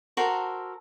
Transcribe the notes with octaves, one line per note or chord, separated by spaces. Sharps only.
F#4 A4 A#4 C5